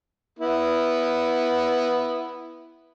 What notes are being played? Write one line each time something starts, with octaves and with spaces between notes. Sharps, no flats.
B3 E4